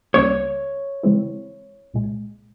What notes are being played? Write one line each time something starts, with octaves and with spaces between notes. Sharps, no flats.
C#2 C#3 G3 A#3 C#5
C#3 E3 G#3 C4 E4
C2 A#2 G#3